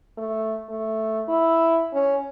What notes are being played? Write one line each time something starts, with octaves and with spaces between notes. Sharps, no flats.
A3
A3
E4
C#4